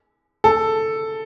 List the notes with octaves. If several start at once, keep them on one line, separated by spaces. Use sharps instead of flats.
A4